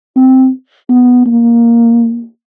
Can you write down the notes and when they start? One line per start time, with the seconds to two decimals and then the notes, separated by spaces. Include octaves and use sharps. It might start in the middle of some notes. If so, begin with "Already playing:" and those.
0.16 C4
0.89 B3
1.26 A#3